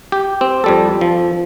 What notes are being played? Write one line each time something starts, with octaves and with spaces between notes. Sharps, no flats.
G4
C4
F2 G3 A4
F3